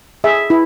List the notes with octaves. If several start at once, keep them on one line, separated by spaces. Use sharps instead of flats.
G#4 E5
E4